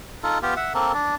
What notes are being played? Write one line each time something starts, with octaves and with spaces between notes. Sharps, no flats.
D#4 F4 A4
B3 F4 G4
E5 F#5
A#3 C4 A4 A#4
D4